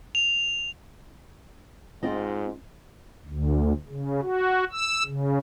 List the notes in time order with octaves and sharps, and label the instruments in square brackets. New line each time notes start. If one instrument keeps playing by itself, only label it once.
[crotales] F7
[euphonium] G#2 [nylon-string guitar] C4 F4 D#5
[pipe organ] D2
C#3
F#4
E6
C#3